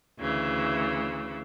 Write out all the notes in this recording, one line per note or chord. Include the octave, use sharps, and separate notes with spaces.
D2 C#3 E3